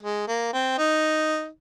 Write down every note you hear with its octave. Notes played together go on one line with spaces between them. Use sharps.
G#3
A#3
C4
D#4